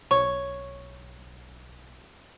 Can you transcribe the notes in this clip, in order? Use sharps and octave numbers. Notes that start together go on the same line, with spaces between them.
B1 C#5